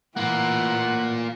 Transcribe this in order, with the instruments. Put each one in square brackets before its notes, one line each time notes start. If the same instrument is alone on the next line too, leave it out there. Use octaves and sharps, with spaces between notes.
[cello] A2 [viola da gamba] E3 [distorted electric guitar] A#3 F4 [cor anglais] F#5